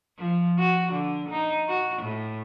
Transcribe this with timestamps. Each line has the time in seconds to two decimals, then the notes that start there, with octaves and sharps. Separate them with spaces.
0.18 F3
0.59 F#4
0.92 D3
1.30 D#4
1.68 F#4
2.02 A2